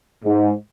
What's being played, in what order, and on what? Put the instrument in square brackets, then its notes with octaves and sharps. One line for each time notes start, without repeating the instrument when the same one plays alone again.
[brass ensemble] G#2